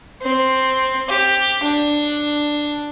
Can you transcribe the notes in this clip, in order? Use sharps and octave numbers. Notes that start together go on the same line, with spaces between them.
C4
G4
D4